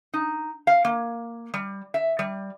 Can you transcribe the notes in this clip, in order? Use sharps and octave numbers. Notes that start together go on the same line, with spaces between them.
D#4
F5
A#3
G3
E5
G3